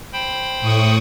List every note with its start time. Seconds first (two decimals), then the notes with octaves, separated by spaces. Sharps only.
0.13 C5 G5 B5
0.61 A2 C#6 D#6